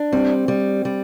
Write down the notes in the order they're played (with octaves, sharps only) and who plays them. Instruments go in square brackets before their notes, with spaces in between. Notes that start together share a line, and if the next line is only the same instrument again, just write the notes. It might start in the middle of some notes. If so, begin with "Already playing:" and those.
Already playing: [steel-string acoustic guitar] D4
[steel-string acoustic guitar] G3 [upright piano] C4
[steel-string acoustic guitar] G3
G3